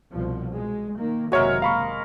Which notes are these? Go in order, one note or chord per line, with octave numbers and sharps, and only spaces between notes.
C2 B2 F3
B2 G#3
D#3 A#3
F#1 D#2 C3 G#3 F#4 A#4 C#5 E5
F5 B5 C#6